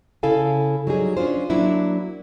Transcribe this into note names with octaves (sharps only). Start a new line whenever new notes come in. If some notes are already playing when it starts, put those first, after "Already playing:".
C#3 E4 A4 F5 G#5
F#3 G3 D#4 G#4
C#4 D4 F4 C5
F#3 A#3 D4 E4 F#4